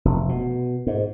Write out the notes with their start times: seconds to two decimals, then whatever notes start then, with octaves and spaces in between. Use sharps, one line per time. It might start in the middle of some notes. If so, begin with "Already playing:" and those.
0.05 F1
0.29 B2
0.87 G#2